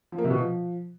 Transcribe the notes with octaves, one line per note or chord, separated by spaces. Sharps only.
F3
A#3
C3
B2
F3